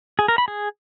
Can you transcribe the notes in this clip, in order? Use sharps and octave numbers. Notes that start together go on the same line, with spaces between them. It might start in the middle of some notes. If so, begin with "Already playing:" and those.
G#4
A#4
B5
G#4